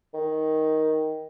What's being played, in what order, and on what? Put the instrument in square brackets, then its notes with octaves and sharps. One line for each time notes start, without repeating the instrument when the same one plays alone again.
[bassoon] D#3